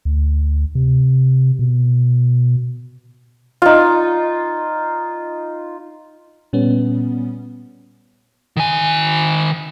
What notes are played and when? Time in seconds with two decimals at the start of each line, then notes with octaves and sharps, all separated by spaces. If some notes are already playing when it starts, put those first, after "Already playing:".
0.05 D2
0.75 C3
1.59 B2
3.62 D#4 F4
6.53 A#2 G3 B3 C#4
8.57 D#3 G#5